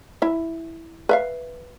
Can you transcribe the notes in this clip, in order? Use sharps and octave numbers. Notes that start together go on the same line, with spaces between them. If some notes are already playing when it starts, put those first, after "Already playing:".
E4 E5
B4 E5 F5